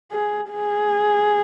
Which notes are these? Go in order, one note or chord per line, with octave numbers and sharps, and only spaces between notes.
G#4
G#4